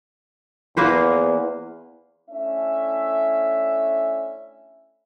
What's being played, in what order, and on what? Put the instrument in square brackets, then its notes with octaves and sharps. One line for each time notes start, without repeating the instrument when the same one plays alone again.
[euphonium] E2 [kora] A#3 B4 C5
[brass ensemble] A3 C#4 D4 E4 E5